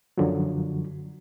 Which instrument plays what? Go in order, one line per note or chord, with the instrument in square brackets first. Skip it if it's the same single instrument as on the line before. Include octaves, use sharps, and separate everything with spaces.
[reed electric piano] F#2 D3 F3 F#3